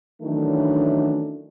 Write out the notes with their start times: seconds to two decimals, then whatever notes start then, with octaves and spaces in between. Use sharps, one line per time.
0.22 D#3 E3 F#3 A3 C#4 D4